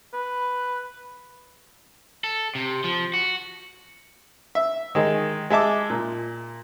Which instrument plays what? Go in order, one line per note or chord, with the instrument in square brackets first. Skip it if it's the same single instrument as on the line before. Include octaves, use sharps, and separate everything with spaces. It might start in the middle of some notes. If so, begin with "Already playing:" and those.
[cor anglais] B4
[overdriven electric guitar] A4
C3
F3
F#4
[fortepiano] E5
D#3 G#3
G#3 E5 A5 D6
A#2